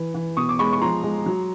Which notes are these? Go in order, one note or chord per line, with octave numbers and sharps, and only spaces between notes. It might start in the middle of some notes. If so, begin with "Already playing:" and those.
Already playing: E3
E3
B2 C#6 D#6
D6
G#3 B5 C#6
C#6
F3 A#5 C6
G#3
F#3